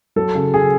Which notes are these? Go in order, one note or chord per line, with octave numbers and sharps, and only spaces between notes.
F#3 A4
C#3
C#3 G#4